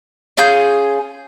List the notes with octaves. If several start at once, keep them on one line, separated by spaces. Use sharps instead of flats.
C#4 F4 G#4 G6